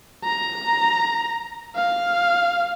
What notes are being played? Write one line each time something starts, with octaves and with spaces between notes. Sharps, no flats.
A#5
F5